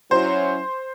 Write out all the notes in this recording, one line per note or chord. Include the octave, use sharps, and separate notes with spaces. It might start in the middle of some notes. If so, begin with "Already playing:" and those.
F#3 C#4 E4 C5